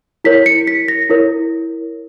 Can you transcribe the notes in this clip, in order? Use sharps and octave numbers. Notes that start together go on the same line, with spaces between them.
E4 A#4 C#5 B6
C#7
B6
A#6
E4 A#4 C#5